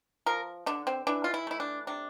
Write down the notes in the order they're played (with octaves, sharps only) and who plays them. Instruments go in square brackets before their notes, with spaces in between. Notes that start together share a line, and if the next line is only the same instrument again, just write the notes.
[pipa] F3 A#4
D3 D4
C4
E3 D4
F4
E4
A3 E4
D4
C3 D4